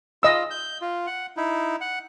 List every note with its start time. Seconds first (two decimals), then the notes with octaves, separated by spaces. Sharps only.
0.23 F4 D#5 E6
0.50 G6
0.81 F4
1.07 F#5
1.37 D#4 E4
1.81 F#5